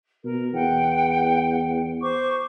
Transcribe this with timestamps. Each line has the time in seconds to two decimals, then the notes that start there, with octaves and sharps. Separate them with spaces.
0.24 B2 A#4
0.53 E2 F#5 G5
2.02 C5 C#6 D6